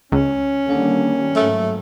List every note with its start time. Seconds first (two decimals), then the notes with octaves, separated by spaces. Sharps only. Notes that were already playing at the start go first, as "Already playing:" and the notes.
0.12 C#2 C#4
0.68 D3 D#3 G3 A#3
1.36 G#2 F#3 A3 A#3